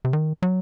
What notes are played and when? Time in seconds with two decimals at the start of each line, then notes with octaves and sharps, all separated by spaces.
0.05 C3
0.13 D#3
0.42 F#3